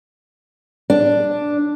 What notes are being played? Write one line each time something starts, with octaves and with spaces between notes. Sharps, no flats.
D4